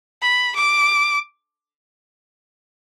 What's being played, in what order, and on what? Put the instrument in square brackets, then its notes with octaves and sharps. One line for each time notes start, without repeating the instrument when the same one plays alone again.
[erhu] B5
D6